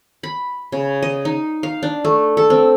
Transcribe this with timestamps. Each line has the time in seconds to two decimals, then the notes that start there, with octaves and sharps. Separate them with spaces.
0.23 B5
0.72 C#3
1.03 D#5
1.25 D#4
1.63 F5
1.83 D4
2.05 A3
2.37 A4
2.50 C4